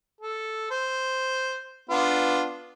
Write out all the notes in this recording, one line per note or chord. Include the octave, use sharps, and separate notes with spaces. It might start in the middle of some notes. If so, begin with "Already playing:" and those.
A4
C5
B3 D4 F4